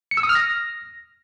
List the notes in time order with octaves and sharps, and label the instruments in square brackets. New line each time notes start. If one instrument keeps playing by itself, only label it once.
[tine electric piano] C#7
E6
D#6
F6
A#6